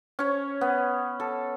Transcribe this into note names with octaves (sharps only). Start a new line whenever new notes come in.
C#4 C#5
B3
A4